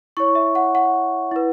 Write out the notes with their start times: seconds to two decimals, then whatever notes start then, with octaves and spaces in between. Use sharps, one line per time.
0.17 E4 C#5 C#6
0.35 E5
0.55 F#5
0.75 F#5
1.32 E4 B4